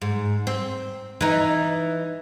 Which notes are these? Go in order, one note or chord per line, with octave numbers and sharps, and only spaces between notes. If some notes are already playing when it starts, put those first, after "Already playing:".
G#2
C4
E3 D#4